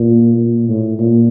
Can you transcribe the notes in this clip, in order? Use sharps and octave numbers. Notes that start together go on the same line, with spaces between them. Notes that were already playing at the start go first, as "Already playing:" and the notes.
Already playing: A#2
A#2
A2
A#2